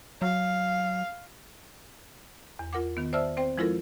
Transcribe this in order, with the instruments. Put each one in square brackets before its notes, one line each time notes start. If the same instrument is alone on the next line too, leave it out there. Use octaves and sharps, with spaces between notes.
[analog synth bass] F#3 [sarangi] F5
[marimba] E2
F4 A#4 F#5 D6
D#3 B3
C5 D5 E5 A5 E6 F6
C4 C5 G5
F3 G#3 E4 F4 A4 A#4